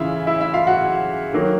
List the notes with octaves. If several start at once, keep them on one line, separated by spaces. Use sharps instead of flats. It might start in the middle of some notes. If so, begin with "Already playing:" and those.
Already playing: C#3 E3 E4 F4 E5
E4 E5
E4 E5
F4 F5
F#4 F#5
D#3 F#3 A#3